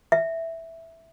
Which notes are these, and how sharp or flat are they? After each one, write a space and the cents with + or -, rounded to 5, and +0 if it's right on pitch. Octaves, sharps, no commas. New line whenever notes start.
E5 +0